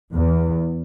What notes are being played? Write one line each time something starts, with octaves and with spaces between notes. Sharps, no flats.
E2